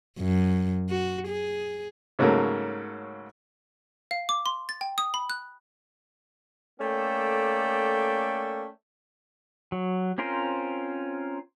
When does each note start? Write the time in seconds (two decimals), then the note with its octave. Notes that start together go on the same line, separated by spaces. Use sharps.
0.18 F#2
0.90 F#4
1.28 G#4
2.19 G#2 C#3 F#3 A3 A#3
4.11 F5
4.29 D6
4.46 C6
4.69 A6
4.81 G5
4.98 D#6
5.14 B5
5.30 F#6
6.80 A3 A#3 C#4 A4 D5 G5
9.72 F#3
10.18 C4 C#4 F4 A#4 C5